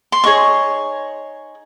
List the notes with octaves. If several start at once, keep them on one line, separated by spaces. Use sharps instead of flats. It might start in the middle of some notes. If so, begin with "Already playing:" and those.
C6
D#4 G#4 C#5 C#6